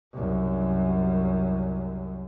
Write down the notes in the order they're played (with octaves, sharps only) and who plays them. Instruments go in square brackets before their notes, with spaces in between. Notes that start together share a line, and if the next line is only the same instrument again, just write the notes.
[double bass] C2 F#2